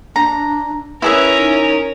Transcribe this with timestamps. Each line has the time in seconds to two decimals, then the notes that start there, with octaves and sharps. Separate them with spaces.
0.16 D4 A#5
1.02 C#4 E4 G#4 A#4 B4 E5
1.38 D#4